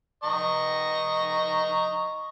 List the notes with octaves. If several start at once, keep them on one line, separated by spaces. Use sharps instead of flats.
D#5 A#5 C#6